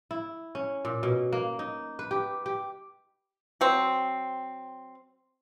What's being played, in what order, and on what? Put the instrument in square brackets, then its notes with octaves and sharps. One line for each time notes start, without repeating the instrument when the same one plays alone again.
[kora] E4
C#4
A#2
B2
A#3
D#4
B4
G4
G4
[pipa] F#3 C4